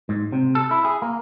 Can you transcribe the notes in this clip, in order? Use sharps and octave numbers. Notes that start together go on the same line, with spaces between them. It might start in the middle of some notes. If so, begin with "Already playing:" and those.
G#2
C3
A4
E4
G#4
A#3